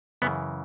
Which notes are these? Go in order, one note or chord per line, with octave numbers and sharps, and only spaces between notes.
F#2 C#3 E3 B3